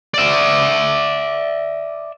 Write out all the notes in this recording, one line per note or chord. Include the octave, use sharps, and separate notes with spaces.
D5 E5